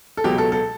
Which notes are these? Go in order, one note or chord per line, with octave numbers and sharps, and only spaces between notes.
A4
C#2 B2 F#3 G4
A4
A4